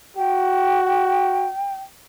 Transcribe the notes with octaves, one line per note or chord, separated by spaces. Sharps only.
F#4 G5